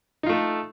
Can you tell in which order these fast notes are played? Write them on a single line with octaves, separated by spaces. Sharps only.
D#4 F4 A3 A4